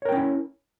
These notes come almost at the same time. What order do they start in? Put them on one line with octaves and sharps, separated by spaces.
C#5 A#4 G5 C#4 E4